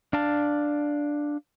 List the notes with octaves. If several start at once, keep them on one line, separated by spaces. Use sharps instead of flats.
D4 F5 A5